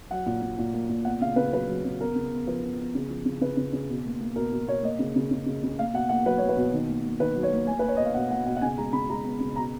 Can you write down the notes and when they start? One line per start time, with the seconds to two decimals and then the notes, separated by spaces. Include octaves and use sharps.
0.11 F#3 F#5
0.26 A#2
0.42 A#2
0.59 A#2
0.74 A#3
0.89 A#2
1.05 B3 F#5
1.21 C#3 F5
1.36 C#3 B4
1.52 F#3 B4
1.69 F#3
1.84 C#3
2.01 B3 A#4
2.15 C#3
2.32 B3
2.47 F3 B4
2.63 B3
2.79 B3
2.95 C#3
3.10 F3
3.25 C#3
3.41 C#3 B4
3.57 C#3
3.73 C#3
3.90 B2
4.05 A#3
4.20 A#3
4.36 B2 A#4
4.52 B2
4.68 B2 C#5
4.83 A#3 D#5
4.99 C#3
5.16 C#3
5.31 C#3
5.46 C#3
5.63 C#3
5.79 A#3 F5
5.93 B2 F#5
6.09 A#3 F#5
6.26 F#3 B4
6.38 A#3 C#5
6.49 B4
6.57 B2
6.73 D#3
6.88 A#3
7.04 A#3
7.20 D#3 B4
7.35 F#3
7.43 C#5
7.52 A#3
7.67 A#3 G#5
7.79 A#3 B4
7.88 C#5
7.97 B2 D#5
8.05 F5
8.14 B2 F#5
8.31 A#3 F#5
8.46 B2 F#5
8.56 F#5
8.61 C#3 G#5
8.78 G#3 A#5
8.93 C#3 B5
9.10 G#3 A#5
9.25 B3
9.40 C#3
9.56 B2 A#5